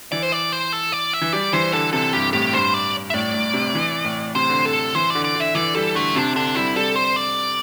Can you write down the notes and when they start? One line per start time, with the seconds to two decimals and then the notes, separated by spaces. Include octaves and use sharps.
0.12 E3 D5
0.23 C5
0.32 D5
0.52 C5
0.73 A4
0.92 D5
1.13 E5
1.21 E3
1.33 G3 D5
1.53 E3 C5
1.73 D3 A4
1.93 C3 A4
2.13 G2 G4
2.33 A2 G4
2.53 G2 C5
2.74 D5
3.10 E5
3.14 A2 D5
3.34 A2
3.53 C3
3.75 E3
4.04 A2
4.35 C3 C5
4.49 D3
4.65 A4
4.95 E3 C5
5.10 D3 D5
5.24 D5
5.35 D3 E5
5.55 E3 D5
5.75 G3 A4
5.95 D3 A3
6.15 C3 D4
6.35 D3 D4
6.55 G3 E4
6.76 G3 A4
6.96 C5
7.16 D5